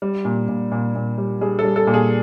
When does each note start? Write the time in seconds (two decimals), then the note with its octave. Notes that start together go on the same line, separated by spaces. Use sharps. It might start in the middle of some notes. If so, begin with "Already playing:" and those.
0.02 G3
0.25 A#2
0.48 A#2
0.72 A#2
0.95 A#2
1.18 G3
1.41 G3 G#4
1.59 A4
1.64 G3
1.76 A4
1.87 A#2
1.94 G#4